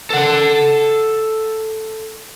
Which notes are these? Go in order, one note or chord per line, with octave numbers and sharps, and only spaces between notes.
A4 F#5